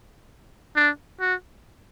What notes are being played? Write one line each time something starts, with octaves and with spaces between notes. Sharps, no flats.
D4
F#4